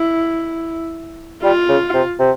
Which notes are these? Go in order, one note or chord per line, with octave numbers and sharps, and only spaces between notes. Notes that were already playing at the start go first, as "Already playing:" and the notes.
Already playing: E4
G3 F4
C#3
C3
C3